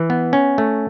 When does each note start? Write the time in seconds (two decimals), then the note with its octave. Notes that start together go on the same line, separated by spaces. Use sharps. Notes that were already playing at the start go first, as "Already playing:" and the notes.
Already playing: E3
0.10 B3
0.33 C#4
0.58 A3